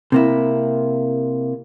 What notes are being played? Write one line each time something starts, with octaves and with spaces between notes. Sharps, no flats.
C3 A#3 E4